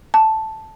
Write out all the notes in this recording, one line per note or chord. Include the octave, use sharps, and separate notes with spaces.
A5